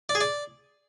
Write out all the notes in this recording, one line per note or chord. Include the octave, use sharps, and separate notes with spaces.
D5
G#4
D5